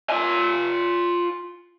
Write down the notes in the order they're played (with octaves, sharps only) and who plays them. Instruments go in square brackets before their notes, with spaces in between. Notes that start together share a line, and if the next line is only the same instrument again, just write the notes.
[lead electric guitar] F4 G#5